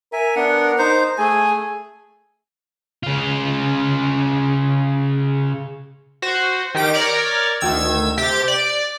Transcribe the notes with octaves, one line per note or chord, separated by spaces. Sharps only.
A#4 E5 G#5
B3 D4 F#5
D#4 C5
A3 G#4 G#5
C#3 F4
F#4 C5
D#3 G4 A#6 D7
A#4 C#5 D5
D2 D#3 E6 G#6
C3 G4 A6
D5